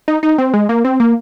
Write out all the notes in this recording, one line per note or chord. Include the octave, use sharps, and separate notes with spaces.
D#4
D#4
C4
G#3
A#3
C4
A#3